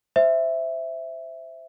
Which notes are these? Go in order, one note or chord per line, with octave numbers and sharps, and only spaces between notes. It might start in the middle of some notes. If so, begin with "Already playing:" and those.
C5 E5